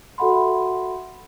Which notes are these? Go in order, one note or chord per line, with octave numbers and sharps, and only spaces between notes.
F#4 A4 E5 F#5 B5 C6